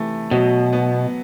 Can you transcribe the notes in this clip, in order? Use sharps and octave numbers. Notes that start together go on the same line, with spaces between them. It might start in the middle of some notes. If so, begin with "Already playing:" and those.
Already playing: C3 E3 A3
B2 F#3
B3